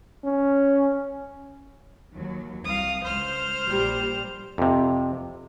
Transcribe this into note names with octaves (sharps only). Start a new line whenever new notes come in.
C#4
D#2 F#3
C2 F5 D#6
C#2 C5 F6
A#1 A#2 G3
F2 C3